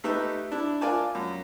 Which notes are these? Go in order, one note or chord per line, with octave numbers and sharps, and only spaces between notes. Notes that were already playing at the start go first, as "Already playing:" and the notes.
A3 D#4 G4 B4 E5
D4 E4
F4 A#4 D5 G#5 A5
F#2